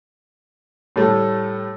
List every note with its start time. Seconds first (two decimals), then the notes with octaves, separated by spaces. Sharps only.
0.96 A2 G3 A3